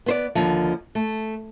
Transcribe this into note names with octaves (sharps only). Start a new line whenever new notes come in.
B3 C5 D5
D#2 D3 F3
A3